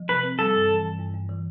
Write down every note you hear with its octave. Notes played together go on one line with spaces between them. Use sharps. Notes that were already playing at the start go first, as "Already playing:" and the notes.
Already playing: F3
C3 B4
C4
G3 A4
G2
E3
G2
G2
G2
E3